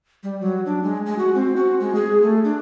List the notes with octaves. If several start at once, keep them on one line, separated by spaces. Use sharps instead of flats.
G3
F#3
D4
G#3
G#3
F#4
C4
F#4
G#3
G#4
A3
D4